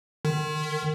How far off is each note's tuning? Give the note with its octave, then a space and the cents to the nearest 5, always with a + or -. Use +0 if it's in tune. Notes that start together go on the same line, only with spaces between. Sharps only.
D#3 -30